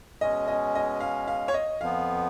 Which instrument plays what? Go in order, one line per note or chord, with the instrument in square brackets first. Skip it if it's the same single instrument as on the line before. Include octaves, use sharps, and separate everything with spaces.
[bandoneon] B2 G#3 C#4 [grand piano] D#5
[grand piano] D#5
D#5
F5
F5
C#5
D#5
[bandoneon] F2 F3 B3 [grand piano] F5